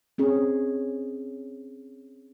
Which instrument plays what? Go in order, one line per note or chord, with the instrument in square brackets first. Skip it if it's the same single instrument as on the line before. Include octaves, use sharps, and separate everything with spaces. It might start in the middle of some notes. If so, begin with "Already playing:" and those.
[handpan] C4 C#4 G#4